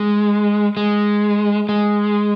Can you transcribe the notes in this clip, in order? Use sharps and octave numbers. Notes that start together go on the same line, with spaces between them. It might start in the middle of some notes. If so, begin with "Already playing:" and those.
Already playing: G#3
G#3
G#3